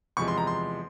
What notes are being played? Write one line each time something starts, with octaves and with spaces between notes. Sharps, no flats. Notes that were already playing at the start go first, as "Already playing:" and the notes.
E2 C3 F3 G#3 C#6
C6
A#5
C6